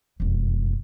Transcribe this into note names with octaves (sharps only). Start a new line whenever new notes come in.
E1 F2